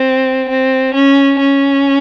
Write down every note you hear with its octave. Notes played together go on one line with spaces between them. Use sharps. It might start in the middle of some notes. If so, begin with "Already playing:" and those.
Already playing: C4
C4
C#4
C#4